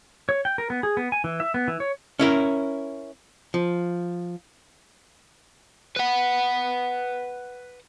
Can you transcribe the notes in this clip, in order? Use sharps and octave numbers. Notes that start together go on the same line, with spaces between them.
C#5
G5
A#4
B3
G#4
B3
G#5
E3
E5
B3
E3
C#5
C#4 E4 A#4
F3
B4 F#5